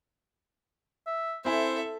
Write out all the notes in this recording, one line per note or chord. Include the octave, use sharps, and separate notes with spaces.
E5
C4 E4 A4 C5 E5 G#5